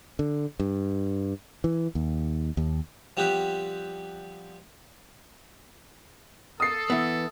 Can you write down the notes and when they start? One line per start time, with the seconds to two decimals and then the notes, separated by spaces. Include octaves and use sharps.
0.19 D3
0.60 G2
1.64 E3
1.95 D#2
2.57 D#2
3.17 F3 G3 B3 C4 G4 B4
6.60 A4 D#6 C7
6.90 E3 B3